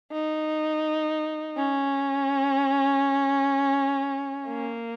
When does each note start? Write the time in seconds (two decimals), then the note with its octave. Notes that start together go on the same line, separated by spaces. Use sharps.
0.12 D#4
1.57 C#4
4.47 A#3